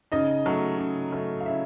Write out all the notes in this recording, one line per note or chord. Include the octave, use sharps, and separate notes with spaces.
C#3 D#4 D#5
F#3 A3
C#3
F#3 A3
F5
C#3 E4 E5